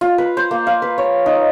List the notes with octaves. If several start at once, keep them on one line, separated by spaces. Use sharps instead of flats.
F4
B4
C5
A#3
F5
B4
C#5
D#4